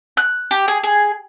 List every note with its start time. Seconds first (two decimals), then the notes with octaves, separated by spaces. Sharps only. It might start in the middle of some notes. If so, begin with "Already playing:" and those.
0.17 F#6
0.51 G4
0.68 G#4
0.83 G#4